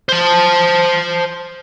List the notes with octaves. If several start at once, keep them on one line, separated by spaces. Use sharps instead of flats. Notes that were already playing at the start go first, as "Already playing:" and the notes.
C5 A5